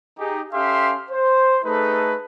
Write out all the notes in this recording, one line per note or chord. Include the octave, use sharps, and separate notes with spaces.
D#4 G4 G#4
C#4 G4 A4 E5 F5 C6
C5
A3 D#4 G#4 A4 B4